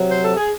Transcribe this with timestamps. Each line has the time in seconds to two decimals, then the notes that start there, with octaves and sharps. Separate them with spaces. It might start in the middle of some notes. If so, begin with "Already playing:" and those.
Already playing: C3 F#3
0.10 C5
0.23 A4
0.37 G#4